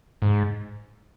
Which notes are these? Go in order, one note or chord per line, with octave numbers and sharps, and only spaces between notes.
G#2